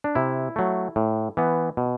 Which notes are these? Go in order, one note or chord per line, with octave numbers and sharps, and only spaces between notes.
D4
C3 E4
F#3 A3
A2
E3 B3
B2